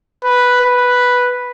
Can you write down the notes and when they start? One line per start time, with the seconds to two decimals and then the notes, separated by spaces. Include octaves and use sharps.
0.23 B4
0.62 B4